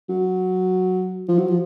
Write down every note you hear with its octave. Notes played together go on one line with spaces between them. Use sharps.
F#3
F3
F#3
F3